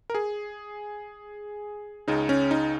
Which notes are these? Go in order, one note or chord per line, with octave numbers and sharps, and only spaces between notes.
A#4
G#4
C#2 C#3 D#4
C#4
D#4